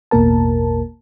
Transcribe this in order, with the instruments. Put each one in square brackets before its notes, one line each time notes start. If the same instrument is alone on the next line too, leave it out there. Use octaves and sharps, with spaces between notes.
[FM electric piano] A1 E2 B2 A#3 A#4 A5